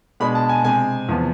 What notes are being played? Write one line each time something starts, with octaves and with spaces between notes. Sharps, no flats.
B2 G#3 D4 B5
A5
G#5
C3 G#3 C4 G#5
E2 C3 F3 B3